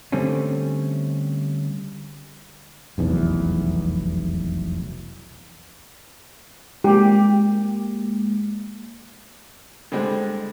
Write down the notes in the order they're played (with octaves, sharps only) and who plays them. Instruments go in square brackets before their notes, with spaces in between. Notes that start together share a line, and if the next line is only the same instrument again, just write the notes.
[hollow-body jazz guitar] D3 G3 A3 C4 C#4
[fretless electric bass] F1 B1 E2
[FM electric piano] G#3 A#3 [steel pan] G4
[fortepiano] D3 G3 G#3 C4